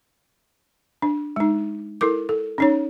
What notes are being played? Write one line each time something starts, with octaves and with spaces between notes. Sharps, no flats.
D4
G#3 D#4
E4 A4 A#4 D6
A4
C#4 D#4 C#5